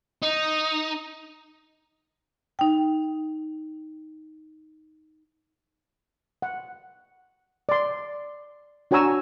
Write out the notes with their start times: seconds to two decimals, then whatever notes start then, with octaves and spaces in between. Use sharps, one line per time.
0.23 D#4
2.59 D#4 G5
6.42 F#5
7.69 D5 C6
8.91 D4 F#4 C#5 G#5 A#5 E6